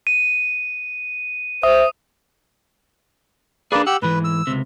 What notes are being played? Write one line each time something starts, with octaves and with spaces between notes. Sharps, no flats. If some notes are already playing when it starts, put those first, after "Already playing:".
D#7
C5 E5 D#6
A#3 D4 G#4 B4 D5
G4 F#5 E6
G#2 E3 B4
E6
C#2 C3